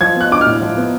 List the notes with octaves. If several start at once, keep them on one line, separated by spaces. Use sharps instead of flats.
F3 G#6
B3 F#6
D4 D6
F6
A2
F3
B3